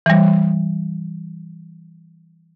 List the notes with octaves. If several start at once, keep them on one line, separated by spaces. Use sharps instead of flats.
E3 G3